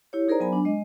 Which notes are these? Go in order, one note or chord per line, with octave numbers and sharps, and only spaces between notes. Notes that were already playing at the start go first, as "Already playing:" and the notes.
E4 G4 C#5
D#4 G#4 A#4 C5 D5 A#5
F#3 B3 G#5 B5
D4
G#3 D#5